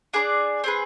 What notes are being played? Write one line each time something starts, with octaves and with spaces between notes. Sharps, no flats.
D4 G#4 B4 D5
C4 G#4 B4